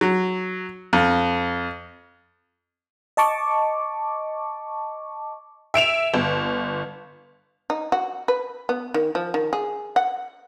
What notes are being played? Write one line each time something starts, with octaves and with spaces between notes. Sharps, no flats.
F#3
F2
D#5 A5 C#6 D6
E5 D7 E7 F7
G1
D#4
F#4
B4
B3
D#3
F3
D#3
G#4
F#5